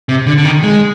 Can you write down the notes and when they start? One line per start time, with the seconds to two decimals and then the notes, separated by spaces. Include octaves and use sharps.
0.09 C3
0.27 D3
0.38 D3
0.45 D#3
0.63 G#3